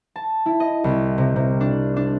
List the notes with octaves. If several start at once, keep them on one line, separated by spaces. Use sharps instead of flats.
A5
E4
D#5
C2
C3
C3
D4
D4